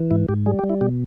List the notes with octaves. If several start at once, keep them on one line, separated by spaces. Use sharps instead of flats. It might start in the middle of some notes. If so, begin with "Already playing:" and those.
Already playing: E3
G#2 E4
G#2 G4
G3 G#4
G4
G3
E4
B2 G4